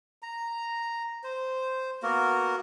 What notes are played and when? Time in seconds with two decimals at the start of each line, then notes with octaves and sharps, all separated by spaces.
0.22 A#5
1.23 C5
2.03 A#3 B3 F#4 A#4